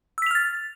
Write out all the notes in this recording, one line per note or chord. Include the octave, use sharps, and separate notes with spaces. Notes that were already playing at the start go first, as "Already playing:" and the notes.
E6 F6 A6 B6 F7